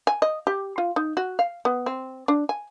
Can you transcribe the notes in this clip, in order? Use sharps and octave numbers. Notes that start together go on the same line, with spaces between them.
G#5
D#5
G4
F4
D#4
F#4
F5
B3
C4
D4
G#5